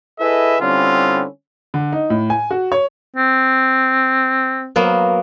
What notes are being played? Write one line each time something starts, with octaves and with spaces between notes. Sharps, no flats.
E4 G#4 A4 B4 D#5 E5
D3 G3 C4 C#4 E4 F4
D3
D#4
A2
G#5
F#4
C#5
C4
F#3 A#3 B3